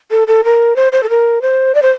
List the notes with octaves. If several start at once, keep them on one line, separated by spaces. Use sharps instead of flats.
A4
A4
A#4
C5
C5
A4
A#4
C5
D5
C5